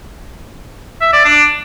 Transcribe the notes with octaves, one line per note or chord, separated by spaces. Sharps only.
E5
D5
D4